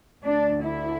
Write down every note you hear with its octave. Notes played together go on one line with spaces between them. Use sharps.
D2 D3 D4
E4